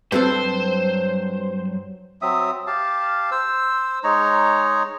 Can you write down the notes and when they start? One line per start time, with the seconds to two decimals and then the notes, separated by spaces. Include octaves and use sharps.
0.12 G2 F#3 C4 A4 B4 C5
2.22 F#3 C4 E5 D#6
2.67 G4 F5 A5
3.31 C5 E6
4.04 G#3 D#4 C#5 A#5